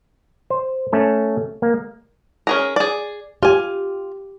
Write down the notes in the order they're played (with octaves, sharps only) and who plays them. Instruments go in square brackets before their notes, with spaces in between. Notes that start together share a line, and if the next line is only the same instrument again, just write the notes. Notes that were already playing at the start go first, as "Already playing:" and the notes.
[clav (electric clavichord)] C5
A3 C#4 A4
A#3
[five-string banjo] C#4 G#4 A#4
G#4 D5
[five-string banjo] F4 G#5 [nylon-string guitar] G4